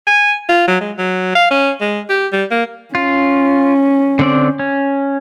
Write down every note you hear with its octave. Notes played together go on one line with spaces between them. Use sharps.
G#5
F4
F#3
G#3
F#3
F5
C#4
G#3
G4
G3
A#3
C#4 F4
D3 C4 D5
C#4